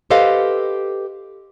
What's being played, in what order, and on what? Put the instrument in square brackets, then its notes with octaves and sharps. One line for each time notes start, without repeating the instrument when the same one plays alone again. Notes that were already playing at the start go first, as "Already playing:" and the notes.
[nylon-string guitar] G4 A4 B4 C5 D#5 F5